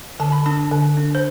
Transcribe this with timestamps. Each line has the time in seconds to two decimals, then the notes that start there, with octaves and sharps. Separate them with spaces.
0.20 D3 A5
0.32 B5
0.46 D4 A5
0.71 D3
0.97 D4
1.15 C5